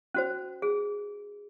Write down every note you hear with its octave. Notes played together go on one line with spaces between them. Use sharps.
C#4 F#4 C5
G#4